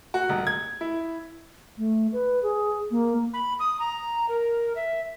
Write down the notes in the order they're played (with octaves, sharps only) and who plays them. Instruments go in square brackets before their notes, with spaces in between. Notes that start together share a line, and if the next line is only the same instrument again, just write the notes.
[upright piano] F#4
D#1
G#6
E4
[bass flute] A3
B4
G#4
A#3
[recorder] B5
D#6
A#5
A#4
E5